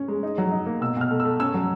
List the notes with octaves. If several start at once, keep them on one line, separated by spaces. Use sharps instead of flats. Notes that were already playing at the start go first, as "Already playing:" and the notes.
Already playing: C#4
G#3
D#4
F#3
D#4
A#3
B2 E6
B2 F6
A3
E6
A3
C#4 E6
F#3